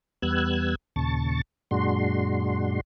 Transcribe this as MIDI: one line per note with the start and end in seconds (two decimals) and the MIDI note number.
0.22 0.75 40
0.22 0.75 55
0.22 0.75 59
0.22 0.75 88
0.22 0.75 90
0.22 0.75 92
0.96 1.41 39
0.96 1.41 46
0.96 1.41 49
0.96 1.41 81
0.96 1.41 85
0.96 1.41 93
1.71 2.80 42
1.71 2.80 46
1.71 2.80 56
1.71 2.80 62
1.71 2.80 66
1.71 2.80 84